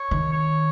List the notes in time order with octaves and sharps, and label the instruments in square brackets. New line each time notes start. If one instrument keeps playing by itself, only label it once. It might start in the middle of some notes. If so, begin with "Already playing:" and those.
Already playing: [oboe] C#5
[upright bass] D#3
[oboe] C#5